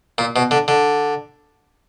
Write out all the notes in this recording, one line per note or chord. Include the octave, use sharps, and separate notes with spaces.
A#2
B2
D3
D3